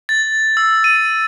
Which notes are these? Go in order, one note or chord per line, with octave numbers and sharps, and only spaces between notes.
A6
E6
D#7